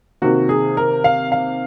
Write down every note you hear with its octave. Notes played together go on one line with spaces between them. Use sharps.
C3 D#3 A#3 F#4
G#4
A#4
F5
F5